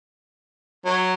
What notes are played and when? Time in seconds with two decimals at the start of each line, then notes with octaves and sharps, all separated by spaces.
0.85 F#3